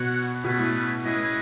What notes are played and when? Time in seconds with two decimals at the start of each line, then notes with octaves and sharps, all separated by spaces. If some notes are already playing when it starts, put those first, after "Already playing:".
Already playing: B2 F#4 C#5 F#5
0.43 B2 A3 C#4 G#4 B4
0.59 A2
1.05 A2 C#4 E4 G#4 B4 D#5